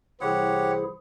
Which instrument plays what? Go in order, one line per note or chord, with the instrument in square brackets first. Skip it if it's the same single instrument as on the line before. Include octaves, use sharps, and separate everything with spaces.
[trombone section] C2 C5 [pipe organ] E3 E4 G#4 [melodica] G4 C#5 F#5